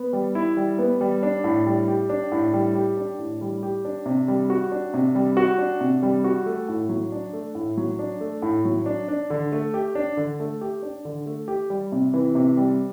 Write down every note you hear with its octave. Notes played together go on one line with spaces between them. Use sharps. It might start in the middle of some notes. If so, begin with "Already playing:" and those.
Already playing: B3
G3
E4
G3
B3
G3
D4
A2
G3
G4
D4
A2
G3
G4
D4
A2
G3
G4
D4
C3
G3
F#4
D4
C3
G3
F#4
D4
C3
G3
F#4
A3
A2
F#3
D4
A3
A2
F#3
D4
A3
A2
F#3
D4
D4
D3
A3
G4
D4
D3
A3
G4
D4
D3
A3
G4
G3
C3
E3
C3
G3